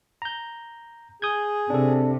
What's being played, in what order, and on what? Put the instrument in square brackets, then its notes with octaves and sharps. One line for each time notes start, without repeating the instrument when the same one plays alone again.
[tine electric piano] A#5 G6
[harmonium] G#4 [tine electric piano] D#6 G6 G#6
[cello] C3 [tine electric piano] D4 A4